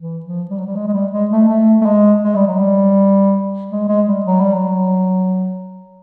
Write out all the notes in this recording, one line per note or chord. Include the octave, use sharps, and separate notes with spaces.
E3
F3
G3
F#3
G3
G#3
G#3
G3
G#3
A3
A3
A3
G#3
G#3
G3
F#3
G3
G#3
G#3
G3
F#3
G3
F#3